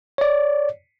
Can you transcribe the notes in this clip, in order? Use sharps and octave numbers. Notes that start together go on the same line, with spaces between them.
C#5 D5